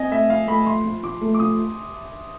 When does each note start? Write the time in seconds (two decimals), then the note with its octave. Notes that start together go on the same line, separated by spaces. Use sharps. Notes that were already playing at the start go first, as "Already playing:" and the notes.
Already playing: C4 D#5 G#5
0.11 A3 E5
0.30 F3 F5
0.48 A3 B5
0.66 F3 C6
0.84 F3
1.03 F3 D6
1.21 A3
1.34 D6
1.40 F3 D#6